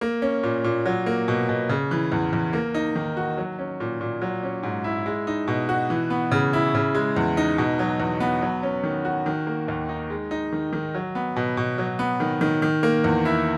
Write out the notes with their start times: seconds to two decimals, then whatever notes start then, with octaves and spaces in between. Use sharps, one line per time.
0.01 A#3
0.22 C#4
0.43 A#2
0.64 A#2
0.86 F#3
1.06 A#3
1.28 B2
1.49 B2
1.69 C#3
1.91 E3
2.12 E2
2.33 E2
2.53 A#3
2.74 D#4
2.96 D#3
3.17 F#4
3.37 F#3
3.59 C#4
3.80 A#2
4.01 A#2
4.22 F#3
4.43 C#4
4.63 G#2
4.84 E4
5.06 G#3
5.27 D#4
5.48 B2
5.69 F#4
5.90 E3
6.10 B3
6.31 C#3
6.53 E4
6.75 C#3
6.95 G#3
7.16 E2
7.37 D#4
7.58 B2
7.79 F#3
8.00 E2
8.20 B3
8.42 F#3
8.63 C#4
8.84 D#3
9.05 F#4
9.26 D#3
9.47 A#3
9.68 D#2
9.89 D#4
10.10 G#3
10.31 D#4
10.53 D#3
10.73 D#3
10.95 F#3
11.15 B3
11.36 B2
11.57 B2
11.78 F#3
11.99 B3
12.20 D#3
12.41 D#3
12.62 D#3
12.83 A#3
13.04 E2
13.25 E4